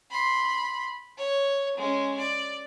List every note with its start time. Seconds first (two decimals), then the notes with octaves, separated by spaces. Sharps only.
0.11 B5 C6
1.18 C#5
1.78 G#3 C#4
2.19 D5